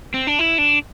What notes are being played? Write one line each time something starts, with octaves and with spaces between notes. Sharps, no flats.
C4
D4
E4
D4